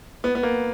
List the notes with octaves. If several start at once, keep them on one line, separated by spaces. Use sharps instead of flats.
B3
B3
A#3